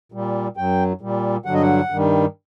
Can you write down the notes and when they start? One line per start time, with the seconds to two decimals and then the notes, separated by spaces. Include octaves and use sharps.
0.12 A#2 G3
0.57 F#2 F#3 G5
1.01 A#2 G3
1.45 G2 D3 F#3 F#5
1.54 D#5
1.62 F#5
1.90 G2 D#3 G3